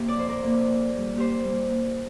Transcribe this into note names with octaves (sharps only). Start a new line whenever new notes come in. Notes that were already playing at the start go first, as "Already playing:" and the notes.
Already playing: C3 A#3 G4
D5
F2 C5
A#4 D5
C3 A#3
A#2
G3 A#3
A#2 G4 C5
G3 A#3
A#2